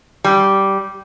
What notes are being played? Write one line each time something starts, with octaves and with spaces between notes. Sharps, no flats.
G3